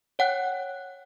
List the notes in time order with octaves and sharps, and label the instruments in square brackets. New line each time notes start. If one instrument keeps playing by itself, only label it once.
[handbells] C#5 F#5 G5 F#6